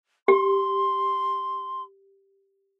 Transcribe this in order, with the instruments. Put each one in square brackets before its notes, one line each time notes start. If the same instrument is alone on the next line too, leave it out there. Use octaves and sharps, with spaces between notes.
[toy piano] G4 [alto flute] C6